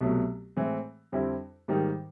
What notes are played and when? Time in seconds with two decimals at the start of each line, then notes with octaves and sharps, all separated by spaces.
0.01 C2 B2 F#3 A3
0.56 A2 E3 G#3 C4
1.12 F2 D3 G3 C4 E4
1.68 G#2 D#3 G3 A#3 D#4